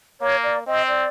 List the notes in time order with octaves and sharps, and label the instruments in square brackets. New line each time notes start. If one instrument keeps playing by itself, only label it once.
[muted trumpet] A#3 [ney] C#5
[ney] D5
[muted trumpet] C4 [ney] D#5
[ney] D5